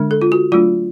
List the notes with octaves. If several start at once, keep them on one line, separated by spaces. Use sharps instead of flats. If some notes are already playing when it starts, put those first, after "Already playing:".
Already playing: D3 G#3 D4
A4
F4
F#4
F#3 A3 D4 F4